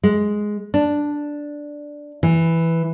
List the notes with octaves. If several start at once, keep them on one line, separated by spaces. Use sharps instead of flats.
G#3
D4
E3